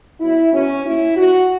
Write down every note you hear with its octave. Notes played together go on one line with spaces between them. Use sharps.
B2 F#3 E4
B2 F#3 C#4
A#2 F#3 E4
A#2 F#3 F#4